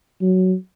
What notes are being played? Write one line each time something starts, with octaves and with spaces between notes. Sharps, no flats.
F#3